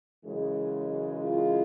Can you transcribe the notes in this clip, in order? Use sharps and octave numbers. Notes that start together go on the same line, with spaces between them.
F#2 C#3 E3 G#3
F4